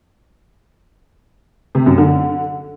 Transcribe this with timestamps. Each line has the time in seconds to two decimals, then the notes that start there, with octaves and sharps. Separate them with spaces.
1.75 C3
1.86 F#2
1.98 D3